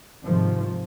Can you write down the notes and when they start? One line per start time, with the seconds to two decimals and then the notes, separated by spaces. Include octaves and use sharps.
0.23 G#2 C3 D#3 F3